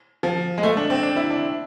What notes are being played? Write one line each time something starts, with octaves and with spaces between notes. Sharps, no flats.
F3
G#3
A3
D4
C4
D4
E4
D4